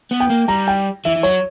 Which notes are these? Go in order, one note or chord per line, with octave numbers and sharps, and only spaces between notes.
B3
G5
A#3
G3 A#5
G5
E3 E5
E3
F#3 C#5